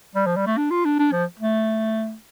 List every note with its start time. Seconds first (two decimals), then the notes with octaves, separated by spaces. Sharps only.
0.15 G3
0.26 F3
0.36 G3
0.47 A3
0.57 D4
0.71 F4
0.85 D4
0.99 D4
1.12 F3
1.40 A3